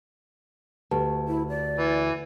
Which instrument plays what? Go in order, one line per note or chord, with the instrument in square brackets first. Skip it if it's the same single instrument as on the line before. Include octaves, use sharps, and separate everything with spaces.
[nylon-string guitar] D2 [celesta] G4 B4 A5
[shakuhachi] E4
D5
[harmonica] E3